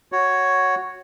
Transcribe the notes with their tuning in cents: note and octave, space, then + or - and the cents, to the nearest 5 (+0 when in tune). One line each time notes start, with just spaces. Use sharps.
F#4 +0 C#5 +0